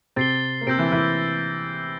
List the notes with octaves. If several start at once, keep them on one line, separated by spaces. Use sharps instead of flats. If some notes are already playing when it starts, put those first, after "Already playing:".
C3 C4 A6 C7 G7
A#3
C3 C4 E6 G6 A#6 D7
E3 E4
E3 E4